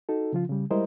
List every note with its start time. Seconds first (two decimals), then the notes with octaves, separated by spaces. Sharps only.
0.09 D#4 F#4 A4
0.33 C#3 F3 F4
0.49 C#3 G3
0.71 G3 G#3 E4 A#4 C5 D#5